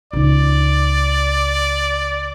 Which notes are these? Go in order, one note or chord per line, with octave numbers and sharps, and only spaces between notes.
C#2 D#4 D5